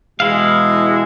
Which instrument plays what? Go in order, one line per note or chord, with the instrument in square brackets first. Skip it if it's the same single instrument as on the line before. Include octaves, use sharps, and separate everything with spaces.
[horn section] B2 E3 G#3 [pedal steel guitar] E4 F5